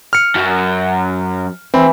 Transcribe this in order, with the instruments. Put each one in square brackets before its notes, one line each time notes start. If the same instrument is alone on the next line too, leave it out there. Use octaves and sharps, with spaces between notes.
[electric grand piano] F6 C#7
[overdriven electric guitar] F#2
[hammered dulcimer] E3 [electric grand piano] C4